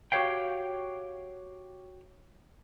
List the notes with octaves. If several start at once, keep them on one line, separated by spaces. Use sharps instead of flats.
F#4 G4 B4 C#5 F5 G5